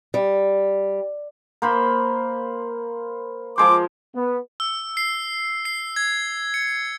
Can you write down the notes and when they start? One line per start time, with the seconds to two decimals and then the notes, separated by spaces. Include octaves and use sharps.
0.14 G3
1.62 A#3 C5 B5
3.58 F3 G#3 C5 D6
4.16 B3
4.60 E6
4.97 C7
5.65 C7
5.96 G#6
6.54 C#7